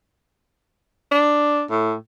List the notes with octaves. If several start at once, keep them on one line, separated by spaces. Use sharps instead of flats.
D4
A2